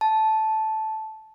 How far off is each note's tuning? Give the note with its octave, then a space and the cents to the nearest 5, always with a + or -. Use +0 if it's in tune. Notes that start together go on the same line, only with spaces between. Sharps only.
A5 -10